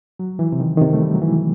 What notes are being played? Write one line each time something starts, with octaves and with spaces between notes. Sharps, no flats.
F#3
E3
C3
D#3
D#3
C3
A3
G3
F#3
E3